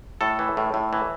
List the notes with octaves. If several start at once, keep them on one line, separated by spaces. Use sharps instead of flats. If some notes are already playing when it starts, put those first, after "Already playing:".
A2 A4
E3
A2
A2
E3